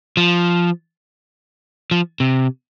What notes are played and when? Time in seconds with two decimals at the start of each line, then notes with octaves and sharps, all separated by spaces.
0.17 F3
1.91 F3
2.20 C3